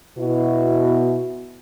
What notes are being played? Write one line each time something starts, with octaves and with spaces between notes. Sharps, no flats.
B2 E4 F#4